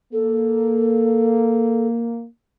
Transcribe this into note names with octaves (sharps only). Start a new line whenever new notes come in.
A#3 A4